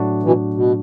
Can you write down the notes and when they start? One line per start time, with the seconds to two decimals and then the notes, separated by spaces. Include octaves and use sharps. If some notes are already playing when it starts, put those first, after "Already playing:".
Already playing: A2 F#3 A3 D4 F#4
0.23 B2 E3
0.54 B2